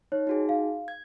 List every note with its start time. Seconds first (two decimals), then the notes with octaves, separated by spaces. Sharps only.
0.12 D#4 C#5
0.27 D#4 F#4 G#4
0.49 F5
0.88 G#6